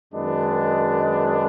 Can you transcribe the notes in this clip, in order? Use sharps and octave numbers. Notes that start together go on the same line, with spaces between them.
F#2 D#3 G#3 B3 D4